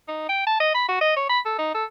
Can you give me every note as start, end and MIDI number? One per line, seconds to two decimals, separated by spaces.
0.08 0.24 63
0.29 0.43 79
0.47 0.60 81
0.60 0.70 75
0.75 0.88 83
0.89 0.98 66
1.01 1.13 75
1.16 1.27 73
1.30 1.39 83
1.46 1.58 69
1.59 1.71 63
1.75 1.85 69